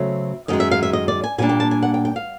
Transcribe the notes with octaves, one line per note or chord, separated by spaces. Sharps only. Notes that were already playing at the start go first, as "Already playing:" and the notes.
Already playing: C#3 F#3 A3 C4 E5
F#2 D#3 G#3 D#5
E5
F5
E5
D#5
D5
G#5
A#2 G3 A#3 D4 G#5
G5
A5
G#5
F#5
G5
G5
F5